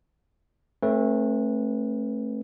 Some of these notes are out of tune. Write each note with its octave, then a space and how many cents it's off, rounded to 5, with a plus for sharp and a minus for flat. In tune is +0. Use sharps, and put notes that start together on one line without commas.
A3 +0 C4 +45 B4 -25